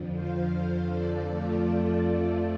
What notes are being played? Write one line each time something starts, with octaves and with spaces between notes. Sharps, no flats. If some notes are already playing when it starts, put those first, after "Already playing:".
Already playing: F2 D3 F3
C5 F5
A4 D5
F2 F3 A3 F4